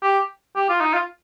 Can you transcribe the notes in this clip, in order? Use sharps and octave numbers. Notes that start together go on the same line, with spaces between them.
G4
G4
F4
D#4
F4